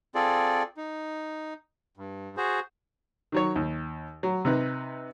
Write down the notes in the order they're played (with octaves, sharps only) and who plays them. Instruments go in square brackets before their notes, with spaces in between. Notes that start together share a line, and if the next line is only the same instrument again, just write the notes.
[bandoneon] C4 F4 G#4 A4 D5
D#4
G2
F#4 G#4 C5
[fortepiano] D#3 F#3 C#5
D#2
F#3
C3 D#4 B4